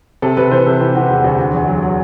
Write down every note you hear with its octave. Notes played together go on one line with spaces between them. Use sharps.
C3 A4
C3 B4
E3 C5
C3 A4
E3 G4
E3 F#4
E1 F#4
D2 F#4
D3 F#4
E2
F#3
F#3